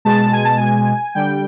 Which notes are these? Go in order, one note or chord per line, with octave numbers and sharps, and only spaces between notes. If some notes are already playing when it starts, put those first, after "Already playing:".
B2 G#3 A5
G#5
A5
G#5
D3 G3 G5